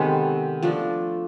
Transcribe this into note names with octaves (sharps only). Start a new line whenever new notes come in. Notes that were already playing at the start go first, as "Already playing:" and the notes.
Already playing: C3 D#3 G#3 B3 A4 B4
F3 A3 D4